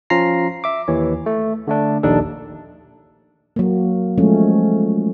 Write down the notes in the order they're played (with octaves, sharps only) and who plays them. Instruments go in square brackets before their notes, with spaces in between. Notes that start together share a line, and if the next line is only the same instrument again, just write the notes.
[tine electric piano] F3 C#4 F4 A#5 A#6 C7
E5 D6
D#2 E3 C#5
A3
D3 A3 D4
A#1 D#2 D4 D#4 A4
[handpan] F#3 A#3
F3 G#3 A3 C#4